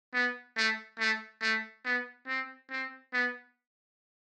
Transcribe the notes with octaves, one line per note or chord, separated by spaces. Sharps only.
B3
A3
A3
A3
B3
C4
C4
B3